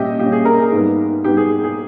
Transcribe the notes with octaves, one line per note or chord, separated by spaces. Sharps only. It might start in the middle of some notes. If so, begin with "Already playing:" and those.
Already playing: A#2 G3 C#4 G4 D#5 E5
A#2 G3 C#4 G4
G#4
A#4
G#4
G#2 G3 B3
G#2 G3 B3 G4
G#4
G#4